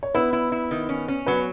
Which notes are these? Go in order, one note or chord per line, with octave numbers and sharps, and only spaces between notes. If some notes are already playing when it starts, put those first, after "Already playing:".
C#5
B3 E4 B4
E4
E4
D#3
C#4
C#4
F#3 B3 B4